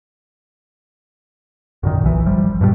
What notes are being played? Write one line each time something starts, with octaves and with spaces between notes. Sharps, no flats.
F#2 A#2 D#3
B1 E3
G1 F3 G3
G2 B2 F3 G3